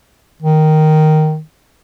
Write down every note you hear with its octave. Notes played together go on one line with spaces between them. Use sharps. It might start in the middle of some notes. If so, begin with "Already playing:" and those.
D#3